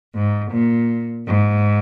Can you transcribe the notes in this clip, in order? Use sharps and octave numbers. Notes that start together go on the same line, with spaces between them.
G#2
A#2
G#2